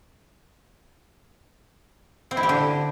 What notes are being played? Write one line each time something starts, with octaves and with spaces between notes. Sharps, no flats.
C4
E4
G4
D3